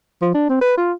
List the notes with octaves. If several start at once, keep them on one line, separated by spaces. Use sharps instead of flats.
F3
D4
C4
B4
F4